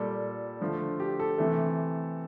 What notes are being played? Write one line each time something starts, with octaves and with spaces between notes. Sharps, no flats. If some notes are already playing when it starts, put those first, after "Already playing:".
Already playing: A#2 G3 A4
D3 F3 A3
G4
A4
C3 E3 A3